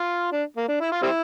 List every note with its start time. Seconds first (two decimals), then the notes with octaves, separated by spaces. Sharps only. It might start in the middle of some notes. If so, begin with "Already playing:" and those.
Already playing: F4
0.32 D4
0.56 A#3
0.68 D4
0.80 E4
0.92 F4
1.02 G3 C4 E4